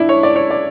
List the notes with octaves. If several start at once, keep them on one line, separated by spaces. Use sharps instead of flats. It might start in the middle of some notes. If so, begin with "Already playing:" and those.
Already playing: D4 E4
C#5
D5
C#5
D5